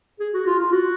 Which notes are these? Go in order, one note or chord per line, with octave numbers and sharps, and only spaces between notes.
G#4
F#4
F4
F4
F#4